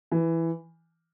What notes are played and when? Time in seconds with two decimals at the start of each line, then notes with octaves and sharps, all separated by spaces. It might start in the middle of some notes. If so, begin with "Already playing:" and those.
0.12 E3